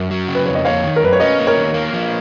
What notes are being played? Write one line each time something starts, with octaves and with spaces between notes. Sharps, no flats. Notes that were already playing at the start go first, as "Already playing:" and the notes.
Already playing: F#2 A#4
F#3
C#3
B4
F2 C#5
D#5
A#3 C#5 F5
D#3
A#4
F#2 B4
C#5
C#4 B4 D#5
A#3
A#4 C#5
D#3
A#3
F3